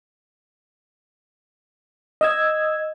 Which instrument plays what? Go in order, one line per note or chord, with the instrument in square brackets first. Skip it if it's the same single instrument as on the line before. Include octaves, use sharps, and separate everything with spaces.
[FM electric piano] D#5 E6 G#6